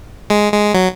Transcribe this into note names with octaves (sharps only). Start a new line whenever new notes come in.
G#3
G#3
F#3